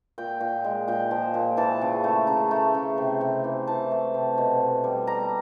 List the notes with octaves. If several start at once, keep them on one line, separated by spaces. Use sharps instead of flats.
A#2 G5
A#2
G#3
A#2 G5
F3
A#2
E3 A5
C#3
A3
C#3 A#5
A3
C#3
C3
C3
E3
E3 A5
A3
C3
B2
B2
G3
G3 A#5